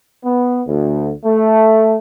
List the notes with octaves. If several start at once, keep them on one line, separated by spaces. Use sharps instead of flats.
B3
D2
A3